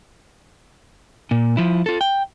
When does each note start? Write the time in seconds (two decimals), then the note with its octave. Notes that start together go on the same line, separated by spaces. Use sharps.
1.31 A#2
1.57 F3 E4
1.86 F4 A4
2.01 G5